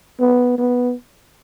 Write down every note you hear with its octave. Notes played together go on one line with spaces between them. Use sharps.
B3
B3